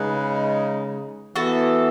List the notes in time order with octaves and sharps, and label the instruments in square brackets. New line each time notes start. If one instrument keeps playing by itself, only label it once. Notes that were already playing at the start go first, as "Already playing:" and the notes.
Already playing: [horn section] C#3 G#3 D#4 [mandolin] G#4 B4
[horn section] E3 B3 E4 [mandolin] F#4 A4